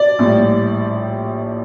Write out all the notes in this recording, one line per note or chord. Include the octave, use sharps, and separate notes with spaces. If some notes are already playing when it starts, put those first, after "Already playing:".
Already playing: D5
A#1 A2 G3